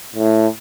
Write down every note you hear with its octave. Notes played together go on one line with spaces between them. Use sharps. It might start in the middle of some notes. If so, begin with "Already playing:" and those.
A2